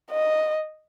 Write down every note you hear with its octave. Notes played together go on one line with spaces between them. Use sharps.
D#5